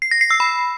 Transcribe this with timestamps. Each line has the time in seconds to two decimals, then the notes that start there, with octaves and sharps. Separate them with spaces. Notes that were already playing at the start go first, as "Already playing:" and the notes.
0.02 C7
0.11 A#6
0.21 C7
0.31 E6
0.40 B5